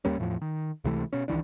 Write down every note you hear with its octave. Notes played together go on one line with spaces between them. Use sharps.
D#2 G3 A#3 C#4
E2 A2 F3
D#3
C#2 C3 E3 A3
B2 C#4
C2 D#3 E3 D4